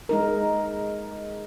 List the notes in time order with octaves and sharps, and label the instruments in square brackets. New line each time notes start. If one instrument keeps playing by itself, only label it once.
[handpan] G#3 D#4 A#4